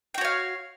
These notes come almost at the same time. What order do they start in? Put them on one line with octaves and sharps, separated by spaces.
G5 F#4 C#5 F5